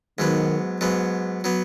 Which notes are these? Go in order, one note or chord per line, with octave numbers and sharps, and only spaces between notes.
G#2 D#3 F#3 B3
G#2 F#3 B3
F#3 B3